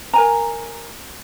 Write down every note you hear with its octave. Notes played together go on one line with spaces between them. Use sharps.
A#4 G#5 A#5